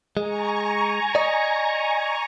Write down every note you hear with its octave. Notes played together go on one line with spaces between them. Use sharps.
G#3 G#5 A#5 C#6
D5 D#5